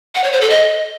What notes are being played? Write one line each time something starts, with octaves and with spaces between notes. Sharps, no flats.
F#5
C#5
C5
A4
D#5